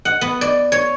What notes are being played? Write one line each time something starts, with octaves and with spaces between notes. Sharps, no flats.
F#5
B3
D5
C#5